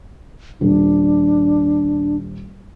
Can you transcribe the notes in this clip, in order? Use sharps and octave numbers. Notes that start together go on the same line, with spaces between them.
D#1 D4